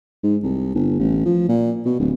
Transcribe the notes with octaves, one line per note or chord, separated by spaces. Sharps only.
G#2
C2
G1
A1
F3
A#2
B2
D1